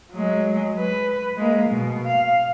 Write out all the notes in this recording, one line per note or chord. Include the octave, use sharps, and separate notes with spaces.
F#3 G#3
B4
G#3 A#3
B2
F5